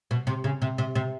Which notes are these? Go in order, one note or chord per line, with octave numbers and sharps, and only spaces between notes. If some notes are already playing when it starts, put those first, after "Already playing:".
B2
C3
C#3
C3
C3
C3